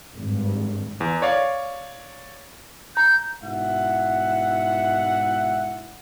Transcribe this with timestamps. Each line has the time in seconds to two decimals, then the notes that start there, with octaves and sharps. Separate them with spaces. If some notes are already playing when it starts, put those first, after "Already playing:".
0.15 G#1 G2
1.00 E2
1.22 C#5 D5 F5
2.97 A#5 G6
3.43 G#2 B2 E4 E5 F#5